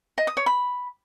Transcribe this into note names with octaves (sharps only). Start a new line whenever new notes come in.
D#5
D#6
C#5
B5